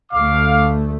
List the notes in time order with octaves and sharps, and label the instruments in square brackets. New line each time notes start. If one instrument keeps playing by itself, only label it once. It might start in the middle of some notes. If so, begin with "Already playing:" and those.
[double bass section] D2 A3 [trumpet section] F5 D6